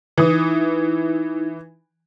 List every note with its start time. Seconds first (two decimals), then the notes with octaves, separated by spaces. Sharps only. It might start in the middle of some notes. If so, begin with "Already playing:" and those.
0.18 E3 D#4 E4 D#6